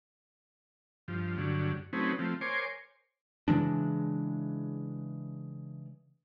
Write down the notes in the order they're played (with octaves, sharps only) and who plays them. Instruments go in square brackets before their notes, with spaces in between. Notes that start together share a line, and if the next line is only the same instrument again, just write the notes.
[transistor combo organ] G2 F3
G2 D3 F#3
F#3 A3 C4 C#4 D#4 B4
F3 A3 C4
A#4 C5 C#5 G#5 C6 D6
[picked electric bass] C#3 E3 G#3 D4